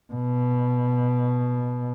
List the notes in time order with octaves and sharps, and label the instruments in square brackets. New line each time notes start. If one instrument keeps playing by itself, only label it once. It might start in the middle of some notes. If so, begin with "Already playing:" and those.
[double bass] B2